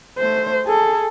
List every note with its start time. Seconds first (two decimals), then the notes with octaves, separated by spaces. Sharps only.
0.18 A3 C5
0.66 G#4 A4